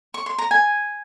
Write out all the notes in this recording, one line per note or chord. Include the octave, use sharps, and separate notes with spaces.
C#6
C6
A#5
G#5